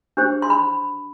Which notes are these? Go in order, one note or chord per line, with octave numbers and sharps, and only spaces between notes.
D4 G4 C5
C6
B5